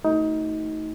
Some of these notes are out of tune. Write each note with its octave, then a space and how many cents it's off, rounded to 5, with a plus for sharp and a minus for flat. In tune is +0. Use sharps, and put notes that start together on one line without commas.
A3 +15 D#4 +20 F#4 +0